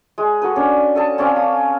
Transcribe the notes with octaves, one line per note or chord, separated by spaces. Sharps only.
G#3
F#4 A4 B4
C#4 D4
A4 D#5 A5
C4 C#4 D5 F5
D#6